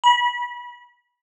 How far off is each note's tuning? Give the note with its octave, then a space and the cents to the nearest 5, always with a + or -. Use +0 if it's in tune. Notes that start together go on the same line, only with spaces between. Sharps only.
B5 -30